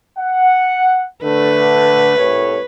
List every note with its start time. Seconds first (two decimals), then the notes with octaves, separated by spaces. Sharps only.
0.18 F#5
1.23 D3 A3 B4
2.17 C2 A2 C#5